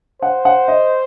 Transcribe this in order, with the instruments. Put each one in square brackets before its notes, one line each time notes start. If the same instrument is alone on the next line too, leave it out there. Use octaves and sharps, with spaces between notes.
[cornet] C5 [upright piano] F#5
[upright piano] F#5
D#5